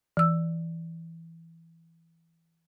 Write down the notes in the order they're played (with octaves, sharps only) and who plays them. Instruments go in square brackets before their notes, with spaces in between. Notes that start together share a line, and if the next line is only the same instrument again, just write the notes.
[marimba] E3 E6